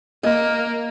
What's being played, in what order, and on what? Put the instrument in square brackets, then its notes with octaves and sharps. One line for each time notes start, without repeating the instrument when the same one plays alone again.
[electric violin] A#3 [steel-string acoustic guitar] D#5